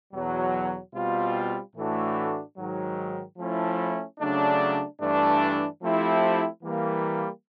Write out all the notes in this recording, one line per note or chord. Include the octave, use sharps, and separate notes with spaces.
E2 B2 F#3
B2 G3 C4 F4
A2 E3 A3 D4 F#4
G#2 D#3 F#3
F3 A3 C#4 E4
C#3 F#3 A3 D4
G2 E3 A3 D4
F3 A3 C4 E4 G4
E3 G3 A#3